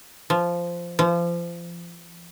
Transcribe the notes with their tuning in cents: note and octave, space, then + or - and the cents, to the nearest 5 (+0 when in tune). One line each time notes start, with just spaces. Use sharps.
F3 -10
F3 -30